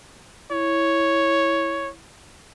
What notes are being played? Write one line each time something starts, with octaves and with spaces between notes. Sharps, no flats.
E4 C#5